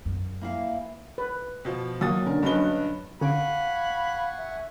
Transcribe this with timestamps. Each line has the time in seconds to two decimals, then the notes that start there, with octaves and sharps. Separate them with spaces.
0.05 F#2
0.41 E3 A#3 E4 F5
1.18 B4
1.65 B2 F3
2.01 D#2 F#3 A#3 D#6 A6
2.26 D3 C#4 A#4
2.43 G2 F#3 C#4 B4 D#5 G7
3.21 D3 C#4 F5 F#5 G#5 B5 C#6 D7
4.37 E5